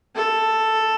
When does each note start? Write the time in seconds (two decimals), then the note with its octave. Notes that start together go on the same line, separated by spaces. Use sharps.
0.16 A4